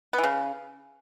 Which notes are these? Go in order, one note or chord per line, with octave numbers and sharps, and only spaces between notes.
B3
E3
C#3